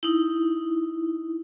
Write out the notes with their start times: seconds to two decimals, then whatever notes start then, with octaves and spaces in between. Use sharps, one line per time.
0.03 D#4 E4